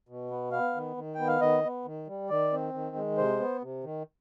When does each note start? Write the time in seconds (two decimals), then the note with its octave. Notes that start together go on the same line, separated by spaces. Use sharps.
0.09 B2
0.31 B3
0.52 B3 F5
0.75 D#3
0.96 D#3
1.15 B3 G5
1.28 F5
1.41 D#3 D#5
1.64 B3
1.85 D#3
2.07 G3
2.29 D#3 D5
2.52 C4
2.74 D#3
2.96 G#3
3.17 C3 C5
3.40 B3
3.62 C3
3.84 D#3